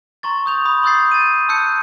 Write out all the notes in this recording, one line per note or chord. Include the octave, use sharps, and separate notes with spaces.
A#5 C6 C#6 A6
D#6 G6 F7
B5 D#6
C6 D#6 E6 G6 A6 C7
A6 D#7
A5 E6 F#6 G6 C#7